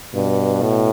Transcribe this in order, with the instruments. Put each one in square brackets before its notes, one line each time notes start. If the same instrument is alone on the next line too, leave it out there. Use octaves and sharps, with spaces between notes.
[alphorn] G2 [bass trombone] B2
[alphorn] A2